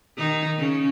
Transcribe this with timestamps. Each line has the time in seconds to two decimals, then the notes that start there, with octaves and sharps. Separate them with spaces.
0.17 D#3 D#4
0.58 C#3 C#4